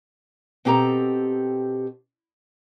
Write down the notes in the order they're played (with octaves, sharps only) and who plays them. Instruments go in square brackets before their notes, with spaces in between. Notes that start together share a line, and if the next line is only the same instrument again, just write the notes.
[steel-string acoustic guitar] B2 C4 G4 A4 A#5